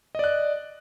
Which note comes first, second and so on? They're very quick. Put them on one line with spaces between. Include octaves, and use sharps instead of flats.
D#5 D5 F#6